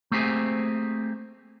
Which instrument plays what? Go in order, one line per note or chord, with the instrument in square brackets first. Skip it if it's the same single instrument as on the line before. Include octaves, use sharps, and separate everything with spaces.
[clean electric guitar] A3 A#3 C4 G4 G#4